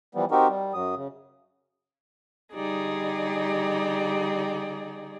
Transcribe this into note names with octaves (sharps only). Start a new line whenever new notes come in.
E3 F3 G3 B3
C4 D#4 F#4 G4 A#4
G3
F#2 F#3 D#6
C#3
D3 G3 D#4 G4 G#4 D5